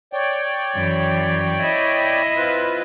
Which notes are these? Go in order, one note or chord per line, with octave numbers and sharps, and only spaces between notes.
C#5 D5 G5
F#2 E3
E4 D#5
C4 F4 B4